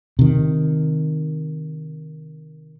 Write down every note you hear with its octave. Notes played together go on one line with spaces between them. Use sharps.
C3 D#3